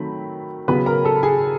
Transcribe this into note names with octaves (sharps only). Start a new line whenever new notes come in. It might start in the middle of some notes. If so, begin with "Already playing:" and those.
Already playing: D#3 F#3 A3 C4 B5
C#3 F#3 B3 B4 B5
A#4 A#5
A4 A5
G#4 G#5